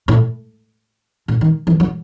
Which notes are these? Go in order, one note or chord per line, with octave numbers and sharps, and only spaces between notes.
A2
A2
D#3
E3
F#3